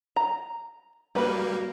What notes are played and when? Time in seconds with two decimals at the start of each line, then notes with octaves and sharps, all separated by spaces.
0.16 A#5
1.15 G3 A#3 F#4 B4 B5